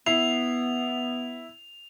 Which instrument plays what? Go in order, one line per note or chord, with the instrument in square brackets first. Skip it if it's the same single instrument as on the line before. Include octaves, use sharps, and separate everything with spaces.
[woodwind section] B3 [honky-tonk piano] E4 C7 [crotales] F7